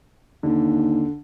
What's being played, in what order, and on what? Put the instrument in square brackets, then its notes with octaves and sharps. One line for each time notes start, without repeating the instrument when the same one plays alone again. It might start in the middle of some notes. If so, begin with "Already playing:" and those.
[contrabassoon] D#2 [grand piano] D3